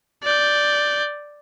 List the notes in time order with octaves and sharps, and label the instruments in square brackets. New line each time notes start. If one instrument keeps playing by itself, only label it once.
[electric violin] D5 G6